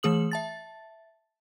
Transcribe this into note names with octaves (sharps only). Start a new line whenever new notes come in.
E3 A3 G#4 D#6 F#7
E5 A5 A6